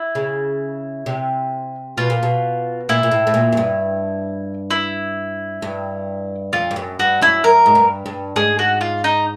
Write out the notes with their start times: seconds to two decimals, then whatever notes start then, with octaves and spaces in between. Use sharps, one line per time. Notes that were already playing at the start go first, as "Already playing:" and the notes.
Already playing: E4
0.15 C#3
1.06 C3
1.98 B2 F4
2.10 A#2
2.23 B2
2.89 A#2 E4
3.03 A#2
3.11 A2
3.27 A2
3.34 A#2
3.52 F#2
3.57 G2
4.71 E4
5.62 G2
6.53 F2 F4
6.71 G2
6.76 F#2
6.99 G2 F#4
7.21 F#2 E4
7.44 F#2 A#4
7.66 G#2
7.75 G2
8.06 G2
8.36 G#2 G#4
8.59 F#4
8.81 F4
9.04 D#4